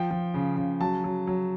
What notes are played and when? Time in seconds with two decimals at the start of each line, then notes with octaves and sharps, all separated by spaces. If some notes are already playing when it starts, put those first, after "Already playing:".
Already playing: F3 G5
0.11 F3
0.34 C#3
0.57 C#3
0.81 F#3 A5
1.04 F#3
1.27 F#3